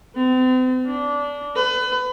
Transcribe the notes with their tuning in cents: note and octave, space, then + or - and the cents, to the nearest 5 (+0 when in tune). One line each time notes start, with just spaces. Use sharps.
C4 -40
D4 -20
B4 +30